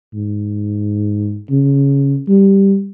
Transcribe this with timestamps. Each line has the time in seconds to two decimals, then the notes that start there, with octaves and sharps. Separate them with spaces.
0.14 G#2
1.50 C#3
2.28 G3